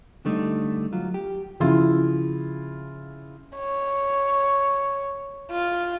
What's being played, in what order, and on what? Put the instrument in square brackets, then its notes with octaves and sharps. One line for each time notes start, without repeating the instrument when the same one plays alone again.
[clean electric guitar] D3 G3 A3 D4 D#4
F#3 F4
G4
[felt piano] C#3 F3 E4 F4
[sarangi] C#5
F4